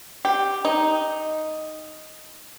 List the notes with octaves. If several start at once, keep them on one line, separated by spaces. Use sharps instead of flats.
G4
D#4